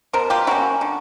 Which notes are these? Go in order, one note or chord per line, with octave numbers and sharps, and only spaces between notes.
B2 A#4 C5
F4 G4
F#3 A#3 C#4 E4 F#4
D3